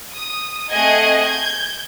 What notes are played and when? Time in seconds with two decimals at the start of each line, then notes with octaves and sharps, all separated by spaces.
0.15 D#6
0.71 A3 C4 G#4 D#5 F#5 G#6
1.20 G6 G#6